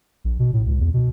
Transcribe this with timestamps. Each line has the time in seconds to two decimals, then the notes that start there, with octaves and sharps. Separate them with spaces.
0.25 A#1
0.39 B2
0.53 A2
0.66 C#2
0.80 E2
0.94 B2